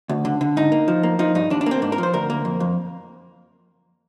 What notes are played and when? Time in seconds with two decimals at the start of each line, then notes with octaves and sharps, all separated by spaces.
0.09 D2
0.25 D3
0.41 D3
0.57 G#2 D#4
0.72 A#3
0.88 F3
1.03 A#3
1.19 F3 D#4
1.35 G2 D#4
1.50 D#2 D4
1.61 D4
1.66 A#3 C4
1.82 G#2 D4
1.92 A#4
1.98 F3 C5
2.13 D2 A#4
2.30 A#3
2.45 F2
2.60 F2